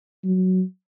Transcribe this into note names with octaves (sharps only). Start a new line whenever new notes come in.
F#3